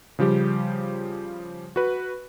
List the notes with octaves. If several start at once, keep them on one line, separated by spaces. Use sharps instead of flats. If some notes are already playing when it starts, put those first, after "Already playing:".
C#3 F3 G3 G4
F#4 B4